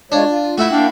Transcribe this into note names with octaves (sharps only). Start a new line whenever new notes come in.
G#3 D4 F4 C#5
F4
A3 E4 F#4
A#3 D4 F5 G5